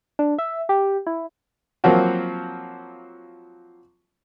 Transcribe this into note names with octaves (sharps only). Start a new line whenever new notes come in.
D4
E5
G4
E4
F3 F#3 A#3 C4 F#4